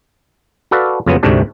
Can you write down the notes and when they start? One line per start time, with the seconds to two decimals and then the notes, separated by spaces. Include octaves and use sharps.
0.71 F#4 A4 B4 D5 F5
1.06 F2 C#3 F#3 B3
1.23 D2 G#2 C3 A3 D4